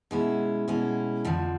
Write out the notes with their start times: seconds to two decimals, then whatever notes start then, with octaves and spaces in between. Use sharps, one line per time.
0.11 B2 G#3 C#4 E4
0.68 B2 G#3 C#4 E4
1.25 F2 D3 F3